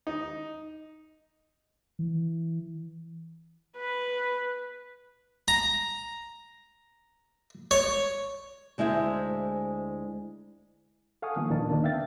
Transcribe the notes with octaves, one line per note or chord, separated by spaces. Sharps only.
D#4
E3
B4
A#5
C#5
D2 G#3 E4 C5 E5
A4 F5 F#5 G#5 C#6 D#6
D#3 F3 A#3 B3
D#2 A#2 D#3 D4 A#4 A5
D3 A#3 C4 D4 D#4
B3 E5 F5 G5 A6